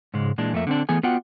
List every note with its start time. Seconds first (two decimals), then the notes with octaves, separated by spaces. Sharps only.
0.14 G#2 C#3 G#3
0.38 A#2 E3 G#3 D4
0.53 F2 A3 A#3 E5
0.67 D3 C4 D4
0.89 E3 A3 B3 G#4 G#5
1.03 B3 F4 F#4 D5 F#5 G5